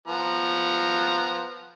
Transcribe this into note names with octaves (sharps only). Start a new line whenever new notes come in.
F3 B3 A#5